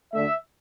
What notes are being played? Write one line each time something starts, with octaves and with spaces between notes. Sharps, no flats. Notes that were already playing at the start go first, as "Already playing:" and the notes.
D2 D3 A3 D4 E5